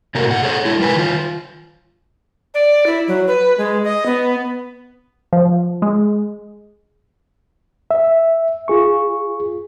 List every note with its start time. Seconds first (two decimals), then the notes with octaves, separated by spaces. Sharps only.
0.15 C3 A3 A#3 F#4 A#4
0.27 A#2 F#5
0.43 G#4 A4 C#5 E5 F#5
0.65 G#3 E4 G#4
0.80 G3 A#4 B4 G#5
0.96 D#3 F4
2.54 D5
2.86 E4
3.08 F#3
3.27 B4
3.58 G#3
3.84 D#5
4.06 B3
5.33 F3
5.82 G#3
7.91 E5
8.68 F4 G#4 C#6